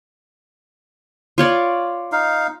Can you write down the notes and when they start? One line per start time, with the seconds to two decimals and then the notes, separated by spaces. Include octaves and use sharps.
1.38 F4 C#5 D5
2.12 D#4 F5